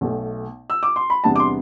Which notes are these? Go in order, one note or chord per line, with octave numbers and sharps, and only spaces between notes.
B1 B2 A3
E6
D6
C6
B5
E2 C3 G3 B3 D4 A5
D6
C6